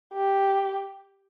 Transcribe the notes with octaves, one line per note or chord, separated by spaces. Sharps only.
G4